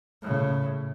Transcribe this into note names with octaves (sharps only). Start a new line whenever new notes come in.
A2 C#3